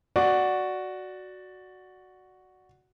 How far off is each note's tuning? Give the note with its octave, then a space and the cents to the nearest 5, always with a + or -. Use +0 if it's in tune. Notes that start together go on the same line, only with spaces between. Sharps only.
F#4 +0 D5 +0